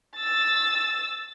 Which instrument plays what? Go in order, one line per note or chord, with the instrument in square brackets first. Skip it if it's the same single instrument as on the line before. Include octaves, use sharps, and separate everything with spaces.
[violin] E6 A6